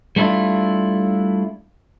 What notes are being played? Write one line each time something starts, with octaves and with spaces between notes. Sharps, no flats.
G3 A3 D4 E4 F4